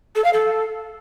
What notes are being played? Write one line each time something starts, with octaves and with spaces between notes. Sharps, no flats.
A4
F5
A4